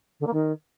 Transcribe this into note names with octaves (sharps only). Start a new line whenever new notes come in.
D3
A#3
D#3